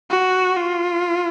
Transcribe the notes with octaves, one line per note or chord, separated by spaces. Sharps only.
F#4
F4